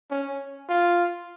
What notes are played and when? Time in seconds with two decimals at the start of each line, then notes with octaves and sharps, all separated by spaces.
0.11 C#4
0.69 F4